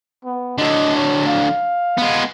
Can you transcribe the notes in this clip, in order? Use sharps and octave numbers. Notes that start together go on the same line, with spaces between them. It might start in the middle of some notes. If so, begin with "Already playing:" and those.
B3
D3 F#3 D#5
C#5
F5
G#3 B3